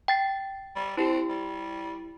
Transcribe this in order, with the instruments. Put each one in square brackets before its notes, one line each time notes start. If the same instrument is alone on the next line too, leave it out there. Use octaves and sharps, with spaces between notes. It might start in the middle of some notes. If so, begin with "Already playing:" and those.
[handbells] G5 A6 C7
[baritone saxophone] G3
[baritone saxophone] C4 [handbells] E4 G4
[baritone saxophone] G3